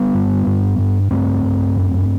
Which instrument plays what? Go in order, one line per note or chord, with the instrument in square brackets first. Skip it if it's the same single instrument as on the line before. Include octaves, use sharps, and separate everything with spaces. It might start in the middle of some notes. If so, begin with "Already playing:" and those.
Already playing: [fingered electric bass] G3 B3
G2
G2
G2
G2 A3 C4
G2
F#2